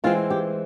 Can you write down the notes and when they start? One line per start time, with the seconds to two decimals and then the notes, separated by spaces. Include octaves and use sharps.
0.04 E3 G#3 C4 F4
0.30 G4